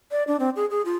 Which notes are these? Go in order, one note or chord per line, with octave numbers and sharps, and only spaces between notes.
D5
D4
C4
G#4
G#4
F4